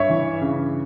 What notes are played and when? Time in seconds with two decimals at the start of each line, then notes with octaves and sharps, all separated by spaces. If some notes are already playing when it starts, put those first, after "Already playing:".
Already playing: G2 C#5 E5
0.10 E3
0.41 C#3